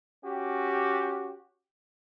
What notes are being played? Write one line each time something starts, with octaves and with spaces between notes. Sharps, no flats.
C#4 F#4 G4